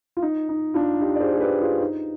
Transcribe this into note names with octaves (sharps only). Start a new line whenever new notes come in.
F4
D#4
D#4
D4 F4
D#4 G4
D5
G#4 C5
G#4
G4 B4
F4 G#4
D#4